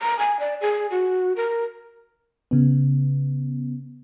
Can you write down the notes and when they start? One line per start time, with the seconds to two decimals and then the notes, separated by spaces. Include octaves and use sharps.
0.02 A#5
0.19 G#5
0.40 D5
0.61 G#4
0.91 F#4
1.36 A#4
2.51 C#3 B3